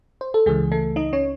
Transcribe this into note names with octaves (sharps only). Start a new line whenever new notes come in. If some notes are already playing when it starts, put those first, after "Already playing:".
C5
A4
C#2 C#3 E3 G#3 G#4
A3 A4
D#4 D#5
C#4 C#5